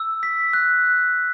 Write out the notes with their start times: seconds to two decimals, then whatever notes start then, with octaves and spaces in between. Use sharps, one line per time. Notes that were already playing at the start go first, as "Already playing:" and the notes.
Already playing: E6
0.23 B6
0.53 F#6